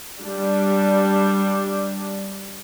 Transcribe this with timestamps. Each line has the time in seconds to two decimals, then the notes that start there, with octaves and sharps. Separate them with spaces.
0.19 G3 D4